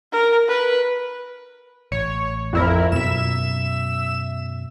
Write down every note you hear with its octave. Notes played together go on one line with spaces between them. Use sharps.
A#4
B4
A1 C#5
F2 E4 A#4
F#2 B2 E5 E7